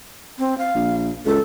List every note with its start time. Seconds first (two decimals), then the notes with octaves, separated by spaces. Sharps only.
0.39 C4
0.58 F5
0.74 A#1
1.26 C#2 A4